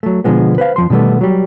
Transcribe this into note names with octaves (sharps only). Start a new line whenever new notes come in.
F#3 A3
B2 D3 F3 G#3 B3
B4 C5 F5
F2 F3 C6
B2 D#3 G3 A3 B3
F#3 G3